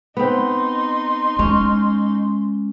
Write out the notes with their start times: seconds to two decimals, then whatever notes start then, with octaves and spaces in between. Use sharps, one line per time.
0.17 B3 C4 D#4 C6
1.39 G#3 C#4